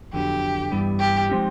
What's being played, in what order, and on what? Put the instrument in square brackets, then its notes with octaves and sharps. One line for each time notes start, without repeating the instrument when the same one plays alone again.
[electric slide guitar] F2 D3 F#3 B3 [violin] G4
[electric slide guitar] G2 E3 G3 B3
[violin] G4
[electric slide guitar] F3 G#3 C4 D#4 G4